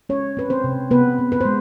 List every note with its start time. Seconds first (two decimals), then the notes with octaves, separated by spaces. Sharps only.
0.09 G#3 C#4 C#5
0.37 C4 B4
0.50 C4 C5
0.64 C3
0.91 C3 B3 B4
1.18 C4
1.32 B4
1.41 C5
1.45 G#3